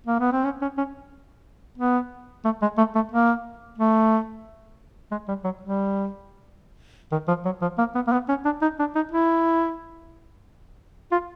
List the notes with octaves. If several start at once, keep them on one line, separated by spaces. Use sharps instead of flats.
A#3
B3
C4
C#4
C#4
C#4
B3
A3
G#3
A3
A3
A#3
A3
G#3
G3
F#3
G3
D#3
F3
F#3
F3
A#3
B3
A#3
B3
C#4
D4
D#4
D4
D#4
E4
F4